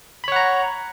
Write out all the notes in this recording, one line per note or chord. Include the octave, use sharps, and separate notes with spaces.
C#5 F#5 A#5 B5